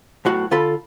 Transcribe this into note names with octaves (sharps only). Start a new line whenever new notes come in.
B1 A2 F#4
D3 F4 A4 B5